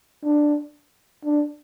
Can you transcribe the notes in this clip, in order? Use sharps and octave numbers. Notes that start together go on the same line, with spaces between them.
D4
D4